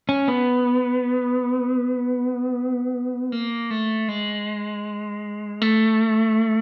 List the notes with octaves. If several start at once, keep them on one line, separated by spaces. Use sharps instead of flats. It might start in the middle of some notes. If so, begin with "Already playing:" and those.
C#4
B3
A#3
A3
G#3
A3